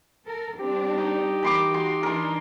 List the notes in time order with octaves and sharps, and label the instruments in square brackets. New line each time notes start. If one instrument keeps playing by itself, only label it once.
[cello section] A4 A#4
[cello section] G3 C4 D4 [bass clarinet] G4
[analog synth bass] D#4
[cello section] E3 A#4 [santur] B5 C6 D6
[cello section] F#4 [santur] C6
[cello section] E3 D4 E4 [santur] A#4 C6